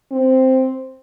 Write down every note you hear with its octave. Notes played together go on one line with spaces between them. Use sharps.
C4